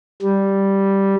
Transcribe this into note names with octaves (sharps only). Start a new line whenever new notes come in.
G3